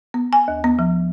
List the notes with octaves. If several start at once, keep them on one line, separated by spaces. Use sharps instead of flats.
B3
G#5
D#2
B3
F3